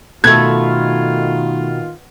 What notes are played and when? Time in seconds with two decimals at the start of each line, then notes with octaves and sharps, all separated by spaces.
0.24 B2 D#3 A3 F4 A4 G#6